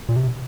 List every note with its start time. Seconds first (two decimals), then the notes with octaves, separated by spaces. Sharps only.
0.09 A#2
0.16 C3